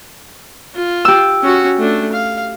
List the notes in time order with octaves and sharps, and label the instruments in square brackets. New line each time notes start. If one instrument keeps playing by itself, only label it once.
[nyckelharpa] F4
[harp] G4 E6
[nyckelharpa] C#4 F#4
A3 D4
F5